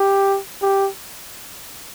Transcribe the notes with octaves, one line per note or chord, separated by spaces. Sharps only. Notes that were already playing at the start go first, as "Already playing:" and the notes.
Already playing: G4
G4